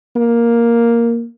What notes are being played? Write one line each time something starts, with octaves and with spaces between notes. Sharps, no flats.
A#3